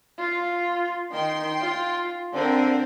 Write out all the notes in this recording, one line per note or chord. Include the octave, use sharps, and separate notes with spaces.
F4
D#3 G5 C6
F4
D3 C4 A#4 C5